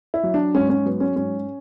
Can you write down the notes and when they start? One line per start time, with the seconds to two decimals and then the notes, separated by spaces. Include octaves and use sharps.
0.14 E4
0.23 F#3
0.34 D4
0.55 G#2 C#4
0.70 C#4
0.86 F#3 B3
1.00 C#4
1.16 G#2 C#4